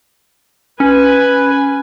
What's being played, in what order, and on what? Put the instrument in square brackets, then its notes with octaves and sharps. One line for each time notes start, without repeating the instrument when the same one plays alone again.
[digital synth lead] C#4 [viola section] B4 G#5